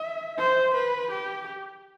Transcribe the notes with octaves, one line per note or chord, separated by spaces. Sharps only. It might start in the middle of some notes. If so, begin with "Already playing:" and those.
Already playing: E5
C5
B4
G4